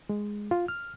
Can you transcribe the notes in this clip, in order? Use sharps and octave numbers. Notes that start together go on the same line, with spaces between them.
G#3
F4
F6